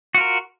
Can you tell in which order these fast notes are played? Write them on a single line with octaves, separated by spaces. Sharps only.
F#4 F4 A#4